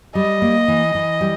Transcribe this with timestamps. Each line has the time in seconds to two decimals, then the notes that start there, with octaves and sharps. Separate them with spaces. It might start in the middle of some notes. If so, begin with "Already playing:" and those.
0.15 G3 D#5
0.42 A#3
0.68 E3
0.95 E3
1.21 G3